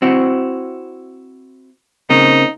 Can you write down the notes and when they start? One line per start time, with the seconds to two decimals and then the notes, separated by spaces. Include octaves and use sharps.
0.02 C4 E4 F#4
2.10 C#3 A#3 C4 D#4